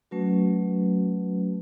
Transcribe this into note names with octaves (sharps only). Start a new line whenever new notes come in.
F#3 A3 C#4 F#4 B4